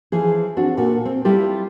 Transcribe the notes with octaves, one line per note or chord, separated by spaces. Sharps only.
E3 F3 G#4
C4 D4 F#4
A#2 F#4 A4
C4
G3 E4 F4 G4 A4